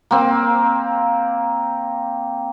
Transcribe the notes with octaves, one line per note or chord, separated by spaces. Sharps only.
A#3 C4